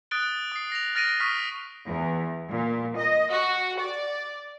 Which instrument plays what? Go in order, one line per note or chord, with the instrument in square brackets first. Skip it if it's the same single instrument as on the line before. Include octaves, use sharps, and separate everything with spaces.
[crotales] D#6 F#6 A6 D7 G7
D#6 C7
A#6 F7
F6 A6 A#6 D7 D#7
C#6 D#6 F6 B6
[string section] E2
A#2
D#5
F#4
D5